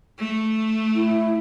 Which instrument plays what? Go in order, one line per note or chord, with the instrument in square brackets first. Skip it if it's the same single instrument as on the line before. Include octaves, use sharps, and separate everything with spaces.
[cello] A3
[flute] E4